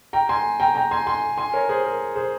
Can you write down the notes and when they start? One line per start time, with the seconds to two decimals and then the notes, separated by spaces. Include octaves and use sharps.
0.13 G5 A#5
0.29 G#5 C6
0.60 G5 A#5
0.75 G5 A#5
0.91 G#5 C6
1.07 G#5 C6
1.38 G#5 C6
1.53 A#4 C#5
1.69 G#4 C5
1.84 A#4
2.16 G#4 C5